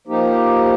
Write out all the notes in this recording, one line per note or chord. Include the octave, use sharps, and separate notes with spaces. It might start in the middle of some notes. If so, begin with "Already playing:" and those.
F3 A#3 D#4 G4